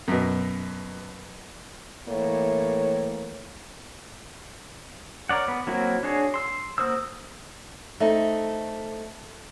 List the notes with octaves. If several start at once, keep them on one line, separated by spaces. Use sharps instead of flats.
F#2 B2
A2 E3 A#3 C#5
A#4 C#5 D5 F#5
B3
F#3 A#3 C4 E4 F#4
D4 F#4 G#4 C#5
C6 E6
A#3 F#4 C5 D#6 E6
A3 C4 D#4